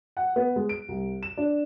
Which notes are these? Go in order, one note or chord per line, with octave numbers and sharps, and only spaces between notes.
F#5
B3
G#3
D7
C2
E7
D4